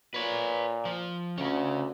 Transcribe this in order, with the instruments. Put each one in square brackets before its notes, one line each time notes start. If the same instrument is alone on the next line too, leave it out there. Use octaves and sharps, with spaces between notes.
[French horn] A#2 [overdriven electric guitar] B4 C#5
[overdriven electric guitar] F3
[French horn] D2 [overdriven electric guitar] C#3 C#4